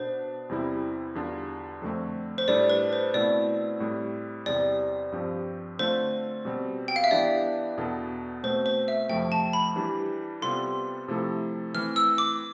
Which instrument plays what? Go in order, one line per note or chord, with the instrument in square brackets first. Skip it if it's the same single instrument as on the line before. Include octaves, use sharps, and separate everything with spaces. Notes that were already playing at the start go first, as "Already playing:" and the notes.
Already playing: [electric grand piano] B2 B3 D4 [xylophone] C5
[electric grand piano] E2 C3 G3 C4 E4
E2 D3 G3 D4 F4
F2 D3 A3 C4
[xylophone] C5
[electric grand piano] A2 G3 D4 A4 [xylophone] D5
[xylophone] B4
C5
[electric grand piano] B2 A3 C4 E4 [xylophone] D5
[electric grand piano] A2 G3 C4
[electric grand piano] E2 C3 G3 [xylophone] D5
[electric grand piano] G2 F3 C4 G4
[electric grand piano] D3 A3 C4 F4 A4 [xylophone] C5
[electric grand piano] B2 G3 C4
[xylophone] G5
F5
E5
[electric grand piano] E3 B3 D4 G4 [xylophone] D5
[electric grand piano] E2 B2 B3 D4 A4
[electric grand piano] B2 A3 C4 [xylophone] C5
[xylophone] C5
E5
[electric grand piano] F2 C3 F3 A3 [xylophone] G5
[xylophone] A5
B5
[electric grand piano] E3 G3 D4 G4
[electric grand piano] C3 G3 B3 F4 A4 [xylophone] C6
[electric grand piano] C3 F3 A3 E4 A4
[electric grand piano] E3 A3 C4 [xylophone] F6
[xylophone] E6
D6